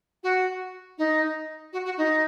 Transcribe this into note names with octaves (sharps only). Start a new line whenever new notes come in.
F#4
D#4
F#4
F#4
D#4